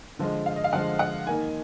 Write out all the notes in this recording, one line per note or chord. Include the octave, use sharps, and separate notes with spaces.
D3 F3 G#3
F5
D#5
F5
D3 F3 G#3 F#5
F#5
D#3 A#3 D#4 G#5